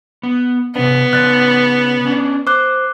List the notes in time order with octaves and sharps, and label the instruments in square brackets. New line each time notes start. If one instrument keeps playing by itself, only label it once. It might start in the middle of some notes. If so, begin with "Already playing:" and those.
[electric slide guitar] B3
[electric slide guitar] C3 D4 [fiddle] B3
[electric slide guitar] C#3 D5 [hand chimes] F#6 A6
[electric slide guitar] C#4 D4
[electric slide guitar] C5 [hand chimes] D6 F#6